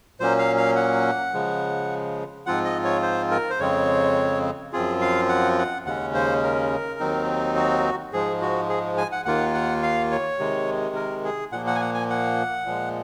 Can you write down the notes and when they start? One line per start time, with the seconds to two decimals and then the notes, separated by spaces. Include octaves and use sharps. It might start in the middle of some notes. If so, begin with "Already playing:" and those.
0.20 A#2 F#3 A#3 C#4 C5
0.39 F5
0.58 F5
0.76 F#5
1.34 C#3 F3 G#3
2.46 G#2 F3 C4 F4 F#5
2.65 D#5
2.85 C#5
3.02 C5
3.31 A#4
3.50 C5
3.60 F2 C#3 G#3 C4 C#5
4.73 F#2 F3 C4 F4 G#4
5.01 F5
5.29 F#5
5.58 F#5
5.86 D#2 C#3 G#3 C#4 F#5
6.14 C5
6.43 A#4
7.00 D#2 D#3 F#3 C4 D#4
7.56 F#4
8.13 G#2 F3 G#3 G#4
8.41 F#4
8.69 G#4
8.98 G#5
9.12 F#5
9.25 D#2 D#3 A#3 F4 F#5
9.54 F#5
9.83 F5
10.11 C#5
10.39 C3 D#3 G#3
10.95 A#4
11.25 G#4
11.52 A#2 F3 A#3 F#5
11.67 F#5
11.75 G#5
11.81 F#5
11.94 G#5
12.10 F#5
12.66 A#2 F3 G#3